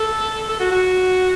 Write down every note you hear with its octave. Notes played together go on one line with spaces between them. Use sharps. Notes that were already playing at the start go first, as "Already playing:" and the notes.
Already playing: A4
A4
F#4
F#4